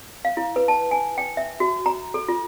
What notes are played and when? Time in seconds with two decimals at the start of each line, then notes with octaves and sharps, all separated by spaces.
0.25 F5
0.37 E4
0.56 B4
0.68 A5
0.91 G#5
1.18 G5
1.37 E5
1.60 F#4
1.86 A#5
2.14 A4
2.28 F4